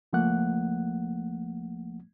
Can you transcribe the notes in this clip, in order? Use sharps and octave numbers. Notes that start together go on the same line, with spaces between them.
C#2 F3 A3 A#3 F#5 F#6